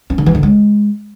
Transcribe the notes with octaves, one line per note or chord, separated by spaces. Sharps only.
C#4
D3
E3
D3
G#3